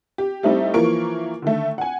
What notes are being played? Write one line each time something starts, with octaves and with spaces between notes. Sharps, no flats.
G4
G3 A3 C4 D#4 E4 G4
E3 F3 A#3 A#4 C#6 D7
D3 D#3 A3
F#5 G#5